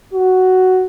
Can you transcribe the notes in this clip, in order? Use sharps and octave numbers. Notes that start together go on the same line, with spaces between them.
F#4